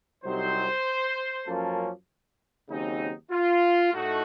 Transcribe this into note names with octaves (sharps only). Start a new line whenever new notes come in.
C2 C3 F#3 C4 D#4 C5
F#2 F3 A#3 C#4 A4
D#2 C#3 F#3 C4 D#4
F4
A2 A3 D#4 F#4